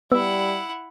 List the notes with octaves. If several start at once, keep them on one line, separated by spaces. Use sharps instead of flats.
G3 B3 E4 F#5 E6